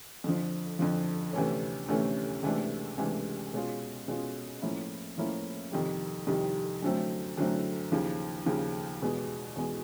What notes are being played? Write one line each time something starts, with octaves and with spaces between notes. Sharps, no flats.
F2 D3 F3
F2 D3 F3
D2 C3 E3 A3 C#4
D2 C3 E3 A3 C#4
C#2 C3 E3 A3 D4
C#2 C3 E3 A3 D4
B2 G#3 C#4 F4
B2 G#3 C#4 F4
A2 F3 A#3 C#4 E4
A2 F3 A#3 C#4 E4
F2 C3 D#3 G3
F2 C3 D#3 G3
F#2 D3 F#3 A3 C4
F#2 D3 F#3 A3 C4
D#2 C#3 F3
D#2 C#3 F3
E2 B2 G#3 B3
E2 B2 G#3 B3